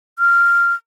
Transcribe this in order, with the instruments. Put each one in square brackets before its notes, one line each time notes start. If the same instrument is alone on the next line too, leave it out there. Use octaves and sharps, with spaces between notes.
[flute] F6